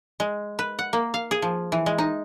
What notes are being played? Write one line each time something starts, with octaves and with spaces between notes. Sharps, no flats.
G#3
B4
F#5
A#3
F5
G#4
F3
E3
G#3
D#4